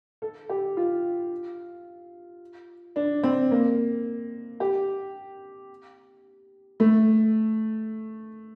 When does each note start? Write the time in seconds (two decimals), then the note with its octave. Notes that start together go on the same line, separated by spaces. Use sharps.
0.22 A4
0.49 G4
0.77 F4
2.96 D4
3.23 C4
3.51 A#3
4.60 G4
6.80 A3